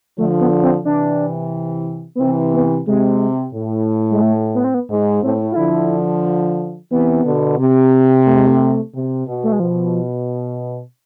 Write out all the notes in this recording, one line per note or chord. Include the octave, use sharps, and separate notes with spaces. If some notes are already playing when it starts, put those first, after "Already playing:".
D3 F3 A3
B3
C4
C3 E3 D4
B3
C3 E3 C4
B3
C3 G#3
A2
G#3
A3
B3
C4
B3
G#2
A2 C4
F4
D3 F3 E4
C3 E3 B3
B2 D3
C3
A3
G#3
A3
C3
B2
A3
G#3
B2 F3